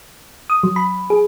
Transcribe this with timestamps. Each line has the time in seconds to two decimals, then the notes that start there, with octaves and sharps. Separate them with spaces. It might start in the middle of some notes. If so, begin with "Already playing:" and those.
0.50 D#6
0.63 F#3
0.76 B5
1.10 G#4